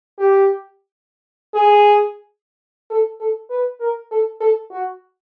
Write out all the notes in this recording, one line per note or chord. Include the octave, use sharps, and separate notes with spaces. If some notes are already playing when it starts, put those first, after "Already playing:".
G4
G#4
A4
A4
B4
A#4
A4
A4
F#4